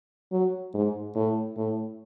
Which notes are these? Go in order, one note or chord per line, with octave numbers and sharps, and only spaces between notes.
F#3
G#2
A2
A2